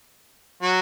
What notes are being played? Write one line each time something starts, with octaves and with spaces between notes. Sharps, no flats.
F#3